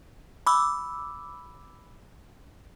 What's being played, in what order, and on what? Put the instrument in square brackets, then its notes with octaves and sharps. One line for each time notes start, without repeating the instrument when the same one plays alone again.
[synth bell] B5 D6 E6